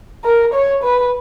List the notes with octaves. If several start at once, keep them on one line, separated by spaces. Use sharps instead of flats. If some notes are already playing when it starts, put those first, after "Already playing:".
A#4
C#5
B4